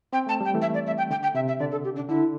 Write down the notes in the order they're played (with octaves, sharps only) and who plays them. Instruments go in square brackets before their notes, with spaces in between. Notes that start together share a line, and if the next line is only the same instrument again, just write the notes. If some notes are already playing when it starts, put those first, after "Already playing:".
[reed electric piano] C4 [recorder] G5
[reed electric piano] A3 [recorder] A5
[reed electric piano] G3 [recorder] G5
[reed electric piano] E3 A3
[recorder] E5
D5
E5
G5
[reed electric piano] D3 [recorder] G5
[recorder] G5
[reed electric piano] C3 [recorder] E5
[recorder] E5
[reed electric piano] D3 [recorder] D5
[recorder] A4
G4
D4
[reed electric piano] D3 [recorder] E4